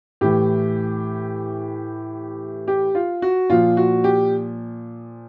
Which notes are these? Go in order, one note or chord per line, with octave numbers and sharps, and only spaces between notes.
A2 E3 G4
G4
F4
F#4
A#2 F3 F4
F#4
G4